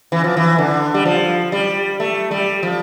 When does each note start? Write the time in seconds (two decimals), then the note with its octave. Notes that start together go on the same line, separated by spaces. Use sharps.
0.12 E3
0.24 F3
0.37 E3
0.58 D3
0.94 G3
1.05 F3
1.52 G3
2.00 A3
2.31 G3
2.63 F3